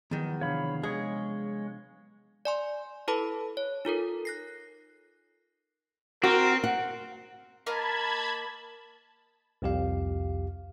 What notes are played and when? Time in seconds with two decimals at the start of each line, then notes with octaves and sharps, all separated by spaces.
0.11 E2 D#3 F3 F#3 B3
0.41 C3 D4 C#5 F5 B5
0.83 G#3 G#4 C#5
2.45 D5 G#5 C6
3.08 E4 A4 B4 A5 B5
3.57 C#5
3.85 D#4 F4 A4 A#4
4.25 F#6 A#6 C7
6.24 C4 F#4 A#4
6.64 F#5
7.66 A#3 D#5 F5 A5 B5 G#6
9.62 C2 F2 G4 F5